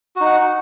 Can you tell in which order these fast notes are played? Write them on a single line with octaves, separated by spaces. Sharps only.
F#4 D#4 F#5